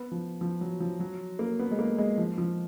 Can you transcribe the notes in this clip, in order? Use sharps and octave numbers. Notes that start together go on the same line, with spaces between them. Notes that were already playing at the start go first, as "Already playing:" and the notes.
Already playing: B3
F3
F3
F#3
F3
F#3
A#3
B3
G#3
A#3
G#3
F3
F3